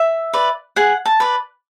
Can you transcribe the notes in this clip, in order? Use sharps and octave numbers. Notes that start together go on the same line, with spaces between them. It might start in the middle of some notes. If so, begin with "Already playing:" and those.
Already playing: E5
B4 D5
G#4 F#5
A5
B4 D5